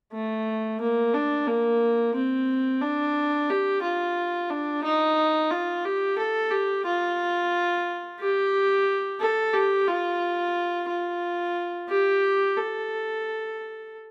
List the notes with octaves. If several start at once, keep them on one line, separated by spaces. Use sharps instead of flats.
A3
A#3
D4
A#3
C4
D4
G4
F4
D4
D#4
F4
G4
A4
G4
F4
G4
A4
G4
F4
F4
G4
A4